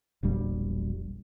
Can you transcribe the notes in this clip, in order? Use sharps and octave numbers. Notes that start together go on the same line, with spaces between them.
E1 A#1 G3